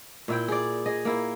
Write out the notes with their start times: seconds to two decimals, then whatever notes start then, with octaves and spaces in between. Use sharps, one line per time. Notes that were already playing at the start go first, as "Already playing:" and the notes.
0.28 A#2 E4 G5
0.48 G#4 D5
0.86 G#4 D#5
1.05 A#3 E4